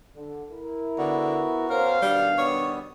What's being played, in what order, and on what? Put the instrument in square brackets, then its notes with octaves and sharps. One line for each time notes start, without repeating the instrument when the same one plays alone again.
[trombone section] D3
E4 A#4
[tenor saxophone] D3 [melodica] B3 F#4
[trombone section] C#4 C5 [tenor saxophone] A#4 [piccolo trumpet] F5
[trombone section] B2 D#3 D4 [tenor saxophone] G3 [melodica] B3
[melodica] G3 B3 D#6 [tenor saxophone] C#5